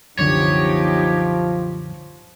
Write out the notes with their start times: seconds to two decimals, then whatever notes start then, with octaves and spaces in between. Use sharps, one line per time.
0.19 C2 F#2 D3 F3 B3 D#4 G4 C#5